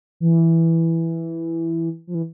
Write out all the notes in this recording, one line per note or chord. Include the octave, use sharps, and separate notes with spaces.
E3
F3
E3